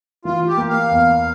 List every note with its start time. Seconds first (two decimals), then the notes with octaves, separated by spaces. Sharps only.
0.25 E3 F4
0.47 G4
0.57 A#3
0.69 F5
0.91 E2